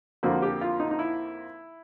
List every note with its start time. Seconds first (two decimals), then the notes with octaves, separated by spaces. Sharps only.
0.23 F2 D3 F3 A#3 F#4
0.42 G4
0.61 F4
0.80 D#4
0.91 D#4
0.99 E4